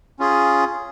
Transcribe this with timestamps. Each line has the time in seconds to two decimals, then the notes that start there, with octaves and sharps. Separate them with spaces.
0.19 C#4 F4 G#4